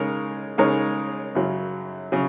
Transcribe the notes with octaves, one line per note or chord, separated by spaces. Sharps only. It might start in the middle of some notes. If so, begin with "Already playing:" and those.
Already playing: C#3 G#3 D#4 A#4 C#5
C#3 G#3 D#4 A#4 C#5
F#2 C#3 F#3
C#3 F#3